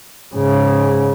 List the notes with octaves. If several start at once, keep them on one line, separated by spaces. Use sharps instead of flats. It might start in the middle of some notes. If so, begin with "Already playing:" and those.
G#2 C#3